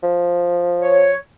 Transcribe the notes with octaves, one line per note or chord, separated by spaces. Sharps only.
F3
C#5